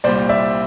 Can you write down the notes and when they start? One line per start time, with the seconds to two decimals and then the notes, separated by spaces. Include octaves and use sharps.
0.04 C2 A#2 G3 C5 D5
0.29 D5 E5